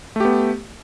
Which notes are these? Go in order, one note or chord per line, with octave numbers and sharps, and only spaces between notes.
A3 B3 G4